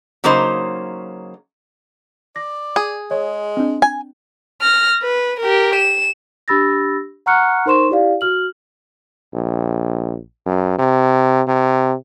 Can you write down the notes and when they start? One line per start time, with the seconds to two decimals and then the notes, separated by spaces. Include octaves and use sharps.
0.24 C#3 F#3 A#3 D#4 C5
2.36 D5 A#6
2.76 G#4
3.11 G#3 C#5
3.57 C4 D4
3.82 G#5
4.61 F6 A#6
5.03 B4
5.40 G4 A#4
5.76 E7
6.48 D4 G4 B5 E6 A6 A#6
7.26 F#5 A#5 C#6 F6 F#6 C#7
7.66 D#4 A#4 C5 C6 C#6 E7
7.90 E4 G4 D5 F5
8.21 F#4 F6 F#7
9.34 A#1
10.46 F#2
10.78 C3
11.48 C3